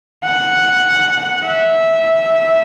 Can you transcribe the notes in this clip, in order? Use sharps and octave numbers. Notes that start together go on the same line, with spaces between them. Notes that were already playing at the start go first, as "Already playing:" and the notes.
F#5
E5